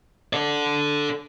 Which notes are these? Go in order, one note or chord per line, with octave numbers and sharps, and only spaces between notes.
A4 D5